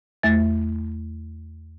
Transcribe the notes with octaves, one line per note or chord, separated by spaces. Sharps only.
E2 A3 E5 A6